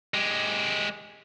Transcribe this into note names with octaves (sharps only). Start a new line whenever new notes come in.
G#3 G4